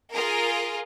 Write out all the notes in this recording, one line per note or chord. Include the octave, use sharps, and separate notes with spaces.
F4 G#4 A#4